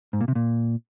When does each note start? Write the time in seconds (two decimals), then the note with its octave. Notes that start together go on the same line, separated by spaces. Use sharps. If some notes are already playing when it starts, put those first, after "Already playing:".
0.13 G#2
0.21 A#2
0.28 C3
0.35 A#2